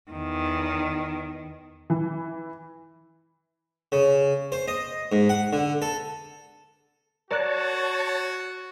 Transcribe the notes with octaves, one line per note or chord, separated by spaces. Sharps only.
E2 D#3
E3
C#3
C5
D#5
G#2
F#5
D3
A4
F#4 A#4 C#5 D5 A5 F#6